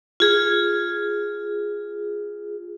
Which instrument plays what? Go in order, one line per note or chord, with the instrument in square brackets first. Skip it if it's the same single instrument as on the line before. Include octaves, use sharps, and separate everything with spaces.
[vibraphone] F4 G#4